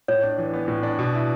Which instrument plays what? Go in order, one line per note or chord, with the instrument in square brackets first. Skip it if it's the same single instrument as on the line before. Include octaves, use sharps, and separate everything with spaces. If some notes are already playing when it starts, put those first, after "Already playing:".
[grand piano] A2 [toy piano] C#5
[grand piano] D4
E3
B3
A2
D4
B2
E4